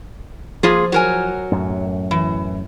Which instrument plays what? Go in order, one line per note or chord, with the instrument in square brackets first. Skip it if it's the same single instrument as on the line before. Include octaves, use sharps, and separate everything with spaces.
[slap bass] F3 [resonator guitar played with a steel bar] A#3 F4 G#4
[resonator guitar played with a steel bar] F#3 A#4 G#5
[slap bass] F#2 A2
[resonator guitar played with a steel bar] E3